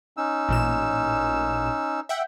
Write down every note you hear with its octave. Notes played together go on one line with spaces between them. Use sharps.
C#4 D#4 E6
A1 A#2 E7
E5 F#5 G5